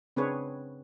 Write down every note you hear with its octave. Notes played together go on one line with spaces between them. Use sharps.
C#3 C4 D4 G#4 B4 C#5